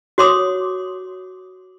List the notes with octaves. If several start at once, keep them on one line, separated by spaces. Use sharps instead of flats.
F#4 C#5 C6 D6 D#6